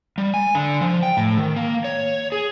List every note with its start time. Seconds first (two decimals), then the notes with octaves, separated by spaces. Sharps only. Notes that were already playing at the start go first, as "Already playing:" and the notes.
0.18 G3
0.34 G#5
0.55 D3
0.81 F3
1.03 G5
1.17 A2
1.38 D#3
1.56 A#3
1.84 C#5
2.32 G#4